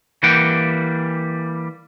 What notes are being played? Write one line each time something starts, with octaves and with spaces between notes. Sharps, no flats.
E3 G3 A#3 F#5 G5